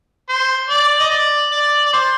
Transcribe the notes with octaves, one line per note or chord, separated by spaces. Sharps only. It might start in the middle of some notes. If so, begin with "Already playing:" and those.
C5
D5
D#5
D5
D5
D5
C5